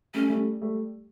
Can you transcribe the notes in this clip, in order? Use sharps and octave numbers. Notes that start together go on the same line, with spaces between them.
G3 A3 C#4
G3 A3
G3 A3